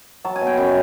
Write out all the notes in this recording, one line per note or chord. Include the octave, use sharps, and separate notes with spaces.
F#3 A5
G#5
B2
G5
F#2 G#5